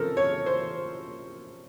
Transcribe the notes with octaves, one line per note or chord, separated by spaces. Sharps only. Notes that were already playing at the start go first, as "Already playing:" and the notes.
Already playing: C#3 F3 C4 A4 A#4
C#5
C5